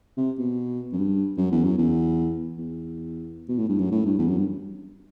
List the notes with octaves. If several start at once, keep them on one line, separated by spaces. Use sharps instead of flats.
C3
B2
F#2
G2
F#2
E2
F#2
E2
E2
B2
A2
G2
F#2
A2
G2
E2
F#2
G2